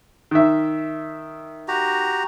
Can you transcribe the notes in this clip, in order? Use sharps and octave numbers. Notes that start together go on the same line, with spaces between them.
D#3 E5
F#4 G4 A#5